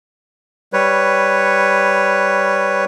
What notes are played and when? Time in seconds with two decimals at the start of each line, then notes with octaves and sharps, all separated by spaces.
0.73 G3 B4 C#5